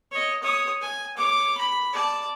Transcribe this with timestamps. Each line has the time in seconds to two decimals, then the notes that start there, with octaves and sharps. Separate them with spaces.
0.12 C#5 D#5
0.42 C#5 D#6
0.81 G#5
1.17 C#5 D6
1.57 B5
1.93 D5 A5